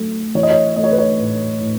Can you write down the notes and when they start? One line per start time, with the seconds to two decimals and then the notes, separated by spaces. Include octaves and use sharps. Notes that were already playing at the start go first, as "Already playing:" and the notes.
Already playing: F#3 A3
0.35 E3 C#5
0.43 D#5
0.51 C#5
0.76 A3 D#5
0.84 C#5
0.91 B4
0.98 C#5
1.19 A2
1.60 A2